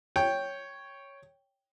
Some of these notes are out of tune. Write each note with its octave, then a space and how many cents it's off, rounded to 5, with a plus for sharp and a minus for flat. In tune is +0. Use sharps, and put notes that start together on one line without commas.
C#5 +0 G5 +0